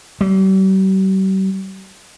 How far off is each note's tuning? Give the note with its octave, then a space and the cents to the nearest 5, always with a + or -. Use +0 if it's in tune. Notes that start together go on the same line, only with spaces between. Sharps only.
G3 -45